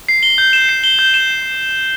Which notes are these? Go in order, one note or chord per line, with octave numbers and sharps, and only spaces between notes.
C7
G7
G6
E7
C7
G7
G6
E7